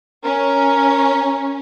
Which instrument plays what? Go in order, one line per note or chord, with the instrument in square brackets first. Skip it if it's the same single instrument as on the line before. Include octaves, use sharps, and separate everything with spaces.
[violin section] C#4 [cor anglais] A#4